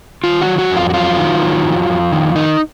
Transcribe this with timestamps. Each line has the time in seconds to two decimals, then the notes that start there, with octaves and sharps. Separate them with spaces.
0.24 D#3 F4
0.41 F#4
0.47 F#3
0.58 F#4
0.70 F2
0.77 F4
0.90 F#4
0.94 F#3 F4
1.18 D#3
1.42 F#3
1.64 F2
1.89 F2
2.12 D#3
2.35 D#3 D#4